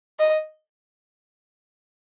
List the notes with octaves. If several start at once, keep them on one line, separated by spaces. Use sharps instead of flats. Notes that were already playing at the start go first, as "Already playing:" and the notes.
D#5